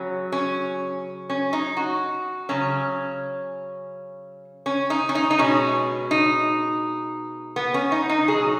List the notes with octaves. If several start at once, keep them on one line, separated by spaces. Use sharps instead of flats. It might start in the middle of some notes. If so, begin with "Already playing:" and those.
Already playing: C#3 F#3 C#4
C#4
C#4
D#4
F#4
C#3 F#3 C#4
C#4
D#4
C#4
D#4
D#4
B2 G#3 C#4
D#4
B3
C#4
D#4
D#4
B2 F#3 G#4